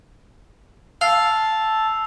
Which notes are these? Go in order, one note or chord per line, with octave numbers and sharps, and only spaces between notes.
F5 A5 E6 C7 F7